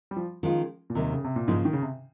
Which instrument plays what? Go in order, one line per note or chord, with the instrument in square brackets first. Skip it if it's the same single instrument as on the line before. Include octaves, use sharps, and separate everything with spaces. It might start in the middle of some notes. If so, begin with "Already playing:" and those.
[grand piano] G3
F3
[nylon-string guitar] D#3 G#3 C#4 F4 [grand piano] F3
[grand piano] A#2
[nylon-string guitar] D#2 D#3 G3 [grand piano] C3
[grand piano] C#3
C3
A#2
[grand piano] G#2 [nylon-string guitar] C#3 F3 A#3 D#4
[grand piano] D#3
C#3
C3